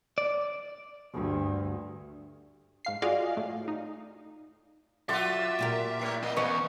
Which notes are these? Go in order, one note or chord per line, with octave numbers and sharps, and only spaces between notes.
D5
D2 G2
G#2 F5 C7
F4 F#4 G#4 D5 D#5 F5
A2
D#4
F#3 F4 F#4 A4 D5 E5 C6
A#2 G4 A#4
A2 A3 E4
A#3 C4 D#5
E2 C#4 B4 D#5 C#6